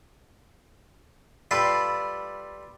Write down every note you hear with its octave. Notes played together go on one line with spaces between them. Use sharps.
G3 F4 A4 B4 F5